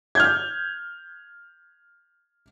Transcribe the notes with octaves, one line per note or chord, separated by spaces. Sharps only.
F6 G6 G#6